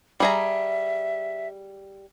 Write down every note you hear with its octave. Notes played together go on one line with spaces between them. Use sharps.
G3 G#4 E5 A#5